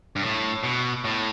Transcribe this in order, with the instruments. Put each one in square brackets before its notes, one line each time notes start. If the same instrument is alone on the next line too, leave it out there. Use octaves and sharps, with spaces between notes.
[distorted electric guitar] G2
A2
B2
A2